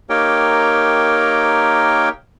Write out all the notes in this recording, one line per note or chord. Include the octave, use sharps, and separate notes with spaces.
A#3 D#4 G4 A#4 C#5 G5